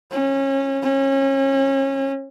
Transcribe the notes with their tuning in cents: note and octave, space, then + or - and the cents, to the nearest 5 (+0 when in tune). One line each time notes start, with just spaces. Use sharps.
C#4 -25
C#4 -30